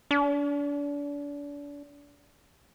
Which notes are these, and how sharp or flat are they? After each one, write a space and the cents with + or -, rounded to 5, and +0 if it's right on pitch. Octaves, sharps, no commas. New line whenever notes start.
D4 -35